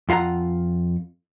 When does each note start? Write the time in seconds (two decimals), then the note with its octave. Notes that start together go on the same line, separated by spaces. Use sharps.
0.09 F2 F4 F#5 A#5